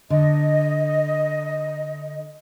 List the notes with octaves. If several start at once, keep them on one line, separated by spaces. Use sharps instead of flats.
D3 D#5